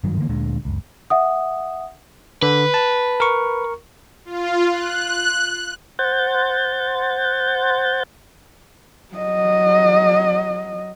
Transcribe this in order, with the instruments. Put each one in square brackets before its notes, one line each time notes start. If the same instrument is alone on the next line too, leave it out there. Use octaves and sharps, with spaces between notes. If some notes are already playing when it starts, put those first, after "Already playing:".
[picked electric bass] G#1 G2 D#3 F#3
D3 E3 G#3 A#3
D2 A#2 D3 G#3
F#1 C#2
[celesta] E5 F#5 D#6
[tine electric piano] D3 [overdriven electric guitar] B4
[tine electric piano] A5
A#4 C#6
[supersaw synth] F4
F#6
[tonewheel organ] C5 F#5 G6 A6
[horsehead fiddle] F#3 D#5